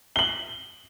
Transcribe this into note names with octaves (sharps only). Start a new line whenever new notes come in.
F#7 G7